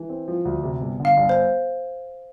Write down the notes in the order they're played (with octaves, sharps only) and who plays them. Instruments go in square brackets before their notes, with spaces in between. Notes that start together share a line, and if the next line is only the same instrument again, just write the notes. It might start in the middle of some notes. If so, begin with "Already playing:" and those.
Already playing: [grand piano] E3
C4
F3
D2
C3
G1
D3
[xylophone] F5
[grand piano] G1
[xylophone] C5